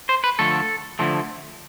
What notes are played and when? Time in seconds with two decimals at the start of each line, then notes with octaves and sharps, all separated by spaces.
0.09 C5
0.24 B4
0.39 D3 F3 A3 A4
0.99 D3 F3 A3